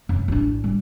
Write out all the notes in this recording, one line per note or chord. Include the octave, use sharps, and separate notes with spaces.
F#2
A1 D4
G3